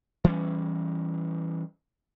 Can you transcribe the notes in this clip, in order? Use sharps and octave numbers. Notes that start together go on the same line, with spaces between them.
E3 G3 C#4